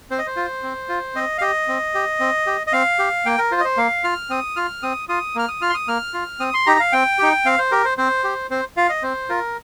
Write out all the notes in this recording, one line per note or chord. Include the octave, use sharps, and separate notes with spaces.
C4 C5
D#5
C5
F4
C4
F4
C4 D#5
F5
G4 D#5
C4
G4
C4
G4
D#5
C4 F5
G4
A#3 G5
A#4
F4 C5
D#5
C5
A#3 F5
F4 F6
C4 D#6
F4 F6
C4 D#6
F4 D#6
A#3 F6
D#6
F4 F6
C6
D#6
A#3 F6
F4
C4 D#6
C6
D#4 G4 A#5
F5
C4 G5
D#4 G4
C4 F5
C5
G4 A#4
C5
C4 C5
G4
C4 C5
F4 F5
D#5
C4 C5
F4 A#4